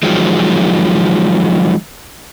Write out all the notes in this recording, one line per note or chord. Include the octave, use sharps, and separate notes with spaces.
D#3 F3 F#3 G#3